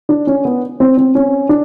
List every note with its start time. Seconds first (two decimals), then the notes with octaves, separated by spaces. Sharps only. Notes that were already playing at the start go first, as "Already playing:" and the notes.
0.09 D4
0.27 C#4
0.45 B3
0.80 C4
0.97 C4
1.15 C#4
1.49 D4